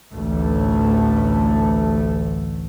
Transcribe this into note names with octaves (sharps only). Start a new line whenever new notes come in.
A1 D2 A3